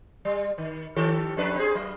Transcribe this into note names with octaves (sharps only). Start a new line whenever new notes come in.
G3
D#3
D#3 G4 A4
F2 D4 B4
C4 G#4
F#3